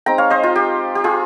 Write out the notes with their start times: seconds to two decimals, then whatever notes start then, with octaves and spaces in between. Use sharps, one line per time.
0.06 G#3 C4 D#4 G5 A#5
0.18 C#5 F5
0.30 C5 D#5
0.43 F4
0.56 G4
0.95 G4
1.04 F4 G#4